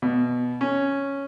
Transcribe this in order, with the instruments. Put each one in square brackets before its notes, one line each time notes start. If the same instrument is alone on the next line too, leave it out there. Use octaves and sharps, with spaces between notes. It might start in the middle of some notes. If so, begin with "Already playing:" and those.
[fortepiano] B2
C#4